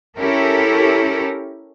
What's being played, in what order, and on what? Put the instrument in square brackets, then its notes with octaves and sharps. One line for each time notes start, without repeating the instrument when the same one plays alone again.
[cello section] C#4 E4 G4 A4 A#4